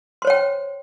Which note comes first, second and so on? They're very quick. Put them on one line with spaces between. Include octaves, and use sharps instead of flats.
C6 C5 C#5 G5